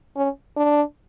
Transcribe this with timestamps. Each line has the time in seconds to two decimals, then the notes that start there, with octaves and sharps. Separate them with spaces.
0.16 C#4
0.57 D4